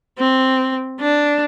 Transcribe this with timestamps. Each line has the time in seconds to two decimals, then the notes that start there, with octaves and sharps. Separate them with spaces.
0.19 C4
1.01 D4